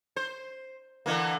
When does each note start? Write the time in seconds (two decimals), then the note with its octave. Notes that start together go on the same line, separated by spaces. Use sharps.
0.16 C5
1.06 D3 E3 A#3